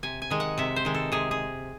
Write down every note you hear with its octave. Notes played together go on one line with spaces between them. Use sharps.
C3 G#5
G#5
D#3 G#3
F#5
C3 E5
C5
D#3 G#3
A4
C3 G#4
G#4